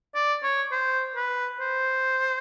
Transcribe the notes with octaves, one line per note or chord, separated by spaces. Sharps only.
D5
C#5
C5
B4
C5